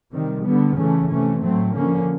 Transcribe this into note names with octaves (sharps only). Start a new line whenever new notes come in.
C3 D#3 G3
D3 G3 B3
C#3 E3 A3 C#4
C3 E3 A3 C#4
A2 F#3 A3 C4
D3 F3 A#3 C#4